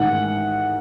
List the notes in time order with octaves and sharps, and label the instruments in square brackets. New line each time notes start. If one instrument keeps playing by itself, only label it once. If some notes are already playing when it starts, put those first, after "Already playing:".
Already playing: [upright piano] A1 G#2 D#3 F#5